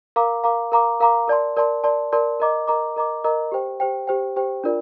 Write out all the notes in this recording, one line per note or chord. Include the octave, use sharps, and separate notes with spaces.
A#4 F5 A#5 D6
A#4 F5 A#5 D6
A#4 F5 A#5 D6
A#4 F5 A#5 D6
A#4 D5 A5 C6
A#4 D5 A5 C6
A#4 D5 A5 C6
A#4 D5 A5 C6
A#4 D#5 A#5 D6
A#4 D#5 A#5 D6
A#4 D#5 A#5 D6
A#4 D#5 A#5 D6
G4 C5 G5
G4 C5 G5
G4 C5 G5
G4 C5 G5
D4 F4 A#4 D5